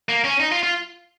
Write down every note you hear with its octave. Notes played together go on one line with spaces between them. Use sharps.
A#3
C#4
D#4
F4
F4